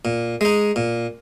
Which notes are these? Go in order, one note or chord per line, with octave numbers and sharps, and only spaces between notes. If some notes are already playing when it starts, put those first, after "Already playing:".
A#2
G#3 D#4
A#2